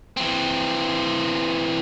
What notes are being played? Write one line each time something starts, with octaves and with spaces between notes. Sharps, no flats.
E3 C4